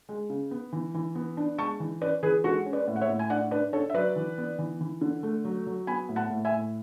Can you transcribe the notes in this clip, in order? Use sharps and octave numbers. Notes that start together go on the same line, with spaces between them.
G#3
C#3
B3
E3
E3
B3
D4
G#3 A5 C#6
E3
C#4 B4 D5
E3 G#4 B4
G#3 F#4 A4
C#4
B4 D5
A2
F#5
C#5 E5
A2
G#5
D4 D5 F#5
D4 B4 D5
D4 A4 C#5
E5
F#3 B4 D5
E3
B3
E3
E3
D3
A3
F#3
F#3
B3 G#5 B5
A2
F#5 A5
A2
E5 G#5
A2